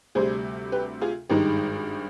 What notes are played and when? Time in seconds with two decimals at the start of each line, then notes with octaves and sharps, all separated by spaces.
0.15 D2 C3 G3 G#4 C5
0.72 G4 B4
1.01 F4 G#4
1.29 G#1 G2 D#3 G#3 D#4 G4